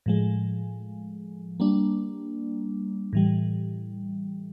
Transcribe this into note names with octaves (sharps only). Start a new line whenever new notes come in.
A2 F3 G#3
G3 A#3 D4
A2 E3 G3